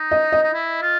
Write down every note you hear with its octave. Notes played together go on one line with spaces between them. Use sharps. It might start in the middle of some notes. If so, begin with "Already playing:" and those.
Already playing: D#4
D#5
D#5
D#4
E4
F4